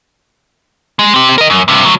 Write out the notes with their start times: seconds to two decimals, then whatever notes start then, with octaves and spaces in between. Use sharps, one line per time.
0.99 G#3
1.14 C4 G4
1.38 A#4 D#5
1.50 F#2
1.68 G2 C3
1.85 D2 F#3